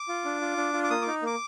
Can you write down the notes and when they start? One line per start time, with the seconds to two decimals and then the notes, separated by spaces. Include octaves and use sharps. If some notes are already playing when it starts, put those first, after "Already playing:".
Already playing: D6
0.09 F4
0.25 D4
0.41 F4
0.57 D4
0.73 F4
0.84 D6
0.90 A#3 D#6
1.02 D6
1.07 D#4
1.22 A#3 D6